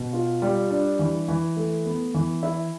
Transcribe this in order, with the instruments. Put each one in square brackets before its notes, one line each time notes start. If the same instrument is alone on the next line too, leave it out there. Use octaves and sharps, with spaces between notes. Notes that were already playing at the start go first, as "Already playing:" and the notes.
Already playing: [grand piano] B2
F4
G3
D4
E3
E3
A3
B3
E3
E4